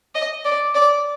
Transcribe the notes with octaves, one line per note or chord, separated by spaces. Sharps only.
D#5
D5
D5